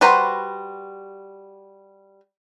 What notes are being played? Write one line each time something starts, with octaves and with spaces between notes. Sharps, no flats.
G3 F#4 B4 C5 A#5